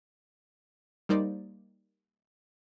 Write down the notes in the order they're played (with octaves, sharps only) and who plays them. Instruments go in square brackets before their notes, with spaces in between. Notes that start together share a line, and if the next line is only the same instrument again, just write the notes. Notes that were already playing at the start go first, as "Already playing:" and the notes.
[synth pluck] G3 A#3 D#4 C5 D5